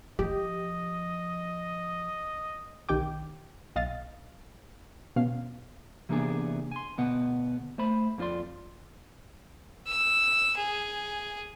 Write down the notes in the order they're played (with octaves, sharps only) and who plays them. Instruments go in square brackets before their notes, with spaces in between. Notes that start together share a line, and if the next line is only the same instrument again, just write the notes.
[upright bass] F3 [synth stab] G4 [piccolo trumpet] D#5
[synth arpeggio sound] B1 D#3 G4 G5 D6
B1 D#5 F5 A6
B2 C#4 F5
[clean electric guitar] C3 E3 A#3 B3 D4 G#4
G#5 C6
D2 B2 B3 F#5
A3 C5 B5
F2 C4 F4 D5 C6
[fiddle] E6
G#4